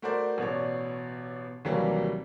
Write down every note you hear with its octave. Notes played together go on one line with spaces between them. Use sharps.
A3 F#4 A#4 C5 D5
A1 B2 C#5 D5
D#2 C3 E3 F#3 G3 A#3